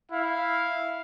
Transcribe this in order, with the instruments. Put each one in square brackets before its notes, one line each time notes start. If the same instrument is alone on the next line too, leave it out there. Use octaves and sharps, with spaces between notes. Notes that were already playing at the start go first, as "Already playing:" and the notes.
[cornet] E4 [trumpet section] F5